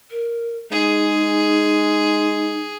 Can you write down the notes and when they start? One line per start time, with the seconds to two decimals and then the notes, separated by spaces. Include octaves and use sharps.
0.11 A#4
0.71 G#3 D#4 G#4